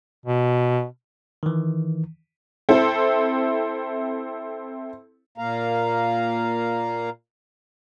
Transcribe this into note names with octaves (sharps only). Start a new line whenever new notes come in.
B2
D#3 E3
C4 E4 A4
A#2 A#3 F5 A#5